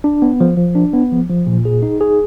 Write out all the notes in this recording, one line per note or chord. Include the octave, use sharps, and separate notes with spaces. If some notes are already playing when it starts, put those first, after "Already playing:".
D4
B3
F3
F3
D4
B3
F3
F3
A#2
G#4
D#4
G#4